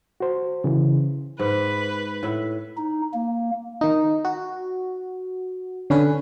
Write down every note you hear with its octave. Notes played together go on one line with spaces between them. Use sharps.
F#4 C5
C#3 E3
G#2 B4
A2 E5 F#5
D#4
A#3
D#3 D#4
F#4
D3 C#4 B4